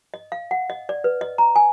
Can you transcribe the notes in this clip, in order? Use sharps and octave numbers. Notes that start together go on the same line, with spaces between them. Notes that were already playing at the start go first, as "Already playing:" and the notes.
D#5
F5
F#5
D#5
D5
B4
D#5
A#5
G#5